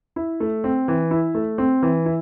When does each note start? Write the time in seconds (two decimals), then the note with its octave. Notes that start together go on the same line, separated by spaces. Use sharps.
0.16 E4
0.40 A3
0.64 C4
0.88 E3
1.11 E4
1.35 A3
1.58 C4
1.83 E3
2.06 E4